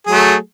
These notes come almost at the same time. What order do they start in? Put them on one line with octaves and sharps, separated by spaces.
G#4 F#3 A3